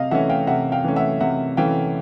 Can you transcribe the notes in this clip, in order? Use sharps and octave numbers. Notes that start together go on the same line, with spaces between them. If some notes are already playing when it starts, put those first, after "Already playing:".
Already playing: C3 D#5 F5
E3 A3 C#4 E5 F#5
F5 G5
C3 E5 F#5
F5 G5
E3 A3 C#4
E5 F#5
C3 E5 F#5
E3 A3 C#4 F5 G5